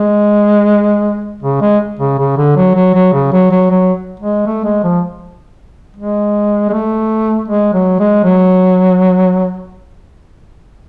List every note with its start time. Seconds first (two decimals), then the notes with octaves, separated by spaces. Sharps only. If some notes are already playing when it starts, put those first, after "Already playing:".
Already playing: G#3
1.43 C#3
1.61 G#3
1.99 C#3
2.18 C#3
2.37 D3
2.56 F#3
2.75 F#3
2.94 F#3
3.13 C#3
3.32 F#3
3.51 F#3
3.70 F#3
4.20 G#3
4.46 A3
4.64 G#3
4.83 F3
5.97 G#3
6.69 G#3
6.73 A3
7.48 G#3
7.74 F#3
8.00 G#3
8.24 F#3